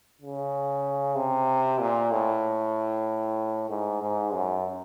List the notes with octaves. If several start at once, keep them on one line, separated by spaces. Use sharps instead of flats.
C#3
C3
A#2
A2
G#2
G#2
F#2